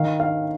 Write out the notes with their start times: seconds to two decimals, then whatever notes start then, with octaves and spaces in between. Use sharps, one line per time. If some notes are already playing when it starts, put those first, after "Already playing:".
Already playing: D#3 F5
0.20 F5